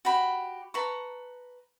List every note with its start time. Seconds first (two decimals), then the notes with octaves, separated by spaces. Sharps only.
0.05 F#4 G4 B5
0.74 B4 A5 A#5 C#6